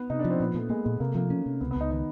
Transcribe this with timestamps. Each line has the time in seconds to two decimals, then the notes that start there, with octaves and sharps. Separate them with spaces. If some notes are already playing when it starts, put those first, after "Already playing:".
Already playing: B3
0.10 C3 D#4
0.19 D4
0.25 F3
0.30 C4
0.40 A#2 B3
0.54 A#2 A3
0.69 G#3 A#3
0.85 A#2 G#3
1.00 C3 A#3
1.08 A3
1.15 F3 A#3
1.30 C#4
1.46 C3
1.61 C#2 B3
1.71 B3
1.76 C#2 D#4
1.91 D#3 D#4